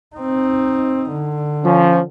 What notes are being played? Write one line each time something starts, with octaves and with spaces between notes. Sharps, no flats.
C4 D#4
D3
F3 C#4